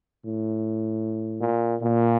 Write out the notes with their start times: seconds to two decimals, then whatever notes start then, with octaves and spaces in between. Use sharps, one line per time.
0.23 A2
1.41 A#2
1.82 A#2